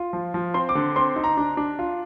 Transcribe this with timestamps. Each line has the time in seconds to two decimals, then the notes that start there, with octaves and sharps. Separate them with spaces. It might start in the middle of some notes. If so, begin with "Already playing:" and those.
Already playing: F4
0.13 F3
0.34 F3
0.54 C4 C6
0.69 D6
0.75 D3
0.96 C4 C6
1.16 D#4
1.24 A#5
1.37 D4
1.57 D4
1.79 F4